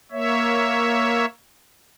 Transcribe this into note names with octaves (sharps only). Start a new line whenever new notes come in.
A#3 C#5 E5